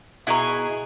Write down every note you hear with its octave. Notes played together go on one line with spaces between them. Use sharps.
B2 E4 G#4 D#5 A#5 C#6